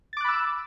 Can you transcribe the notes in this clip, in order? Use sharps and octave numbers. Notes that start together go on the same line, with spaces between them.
B5 D6 E6 F#6 A6